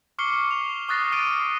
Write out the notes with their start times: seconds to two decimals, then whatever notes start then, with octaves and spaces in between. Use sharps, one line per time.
0.19 C#6 D6 F6 C7 C#7 G7
0.51 F7
0.89 C#6 D#6 F#6 A6 A#6 C7
1.12 D6 F6 C7 D7 D#7